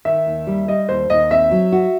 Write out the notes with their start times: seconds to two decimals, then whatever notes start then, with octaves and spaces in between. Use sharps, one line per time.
0.05 D#3 E5
0.26 D#2
0.47 G3
0.68 G3 D#5
0.89 D#2 C5
1.10 D#2 D#5
1.31 C4 E5
1.51 F#3
1.72 F#4